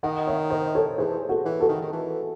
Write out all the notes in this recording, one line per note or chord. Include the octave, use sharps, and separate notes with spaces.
D#3 D#5 F#5
C#5 E5
C5 D#5
A4 C#5
E3 G#4 C5
F#4 A4
E3
F#4 A4
D#3
D#3
E3